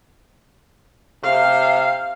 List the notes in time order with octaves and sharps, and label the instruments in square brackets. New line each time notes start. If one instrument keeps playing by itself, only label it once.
[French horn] C3 [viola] F5